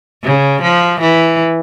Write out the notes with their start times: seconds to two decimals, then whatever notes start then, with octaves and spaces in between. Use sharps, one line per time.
0.24 C#3
0.62 F3
1.00 E3